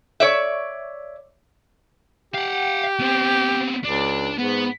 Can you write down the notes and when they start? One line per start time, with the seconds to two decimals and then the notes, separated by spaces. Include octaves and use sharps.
0.20 C#5 D5 E5
2.34 G4 F5 F#5
2.99 B3 C4
3.84 C#2 D4
4.38 G#2 B3